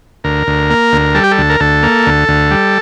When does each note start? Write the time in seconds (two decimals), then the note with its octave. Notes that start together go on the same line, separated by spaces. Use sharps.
0.24 D2 A#4
0.47 D2
0.70 A#3
0.93 D2
1.15 G3 A4
1.24 G4
1.31 A4
1.38 D2
1.50 A#4
1.60 D2 A4
1.83 A#3
2.06 D2
2.28 D2
2.51 G3